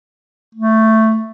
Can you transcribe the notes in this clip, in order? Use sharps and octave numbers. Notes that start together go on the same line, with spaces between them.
A3